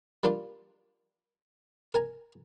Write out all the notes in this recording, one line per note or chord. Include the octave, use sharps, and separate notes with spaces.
G3 A#3 D4 F4
A#4 G#5 A#5